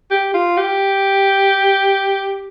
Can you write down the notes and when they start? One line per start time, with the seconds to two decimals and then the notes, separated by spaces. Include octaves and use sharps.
0.11 G4
0.34 F4
0.57 G4